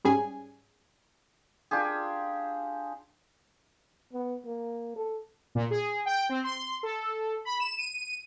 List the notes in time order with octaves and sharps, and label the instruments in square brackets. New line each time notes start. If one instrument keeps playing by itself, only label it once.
[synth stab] G#2 G3 C#4 G#4 G#5
[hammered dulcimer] D4 F4 G4 G#4
[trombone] B3
A#3
A4
[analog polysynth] A#2
G#4
G5
C4
C6
A4
B5
E7
D#7